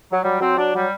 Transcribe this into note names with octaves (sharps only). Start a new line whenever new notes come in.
F#3
F#3 G3
F#3 C4
F#3 D4
F#3 G3